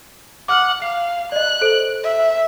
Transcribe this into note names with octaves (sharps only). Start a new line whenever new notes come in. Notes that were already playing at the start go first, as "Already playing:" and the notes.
F#5 D6 F6 F#7
F5 C7
D5 D#5 F#6
A4 C5 D7
E5